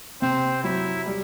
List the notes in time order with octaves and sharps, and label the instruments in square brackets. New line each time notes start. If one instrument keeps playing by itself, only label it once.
[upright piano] C3 [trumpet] C4
[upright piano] F#3 [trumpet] E4
[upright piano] G3